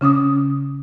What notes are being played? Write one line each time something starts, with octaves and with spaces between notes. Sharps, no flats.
C#3 C#4 D6 D#6